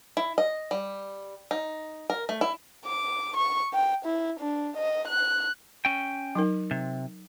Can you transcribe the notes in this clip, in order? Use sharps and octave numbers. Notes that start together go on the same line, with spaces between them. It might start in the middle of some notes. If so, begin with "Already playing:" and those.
E4
D#5
G3
D#4
A#4
A3
E4
D6
C#6
G5
E4
D4
D#5
F#6
C#4 G5
F#3 D#4 A#4
C3